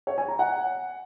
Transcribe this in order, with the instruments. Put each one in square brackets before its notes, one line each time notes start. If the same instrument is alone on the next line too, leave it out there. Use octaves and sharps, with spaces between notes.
[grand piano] C#5
G#5
A#5
F#5